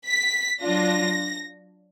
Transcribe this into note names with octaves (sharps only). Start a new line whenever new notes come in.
B6
F#3 D4 F4 A#6